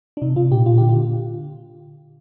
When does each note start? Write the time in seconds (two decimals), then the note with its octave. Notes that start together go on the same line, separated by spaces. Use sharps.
0.17 D4
0.22 C3 D#4
0.36 C3 F4
0.51 A#2 G4
0.66 A#2 F4
0.78 D3 G4
0.89 F4
0.96 D3